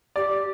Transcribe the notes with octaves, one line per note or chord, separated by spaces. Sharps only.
G4 D5